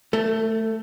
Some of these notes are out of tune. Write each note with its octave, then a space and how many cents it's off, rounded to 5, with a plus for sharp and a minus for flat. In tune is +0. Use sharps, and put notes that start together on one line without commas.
A3 +5 A4 +35